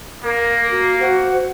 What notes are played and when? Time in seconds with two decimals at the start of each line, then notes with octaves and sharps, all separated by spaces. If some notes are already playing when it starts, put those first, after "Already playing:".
0.24 A#3 A#4
0.71 F#4
1.00 F#4 C5